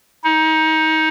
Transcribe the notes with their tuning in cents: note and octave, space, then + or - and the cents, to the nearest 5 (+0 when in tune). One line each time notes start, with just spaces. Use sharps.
D#4 +25